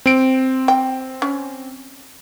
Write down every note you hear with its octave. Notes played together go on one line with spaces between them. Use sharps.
C4 D7
G5
C#4